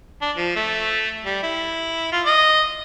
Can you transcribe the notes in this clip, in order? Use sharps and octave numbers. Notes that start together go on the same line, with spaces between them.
D4
F3
A3
G3
E4
F4
D#5